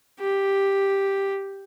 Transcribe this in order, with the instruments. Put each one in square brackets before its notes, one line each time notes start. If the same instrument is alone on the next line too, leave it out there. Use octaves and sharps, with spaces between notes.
[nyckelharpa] G4